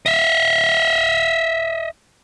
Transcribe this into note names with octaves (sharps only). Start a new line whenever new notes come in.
D#5 E5